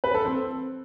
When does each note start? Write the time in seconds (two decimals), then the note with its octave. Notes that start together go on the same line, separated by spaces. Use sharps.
0.04 B4
0.14 A4
0.25 C4